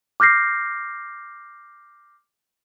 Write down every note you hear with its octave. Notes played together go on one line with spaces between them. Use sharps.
D6 F6 G6 A#6 C7